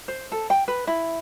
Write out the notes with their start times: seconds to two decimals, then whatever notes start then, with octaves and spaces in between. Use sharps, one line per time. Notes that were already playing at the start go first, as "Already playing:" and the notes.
0.08 C5
0.32 A4
0.50 G5
0.68 B4
0.87 E4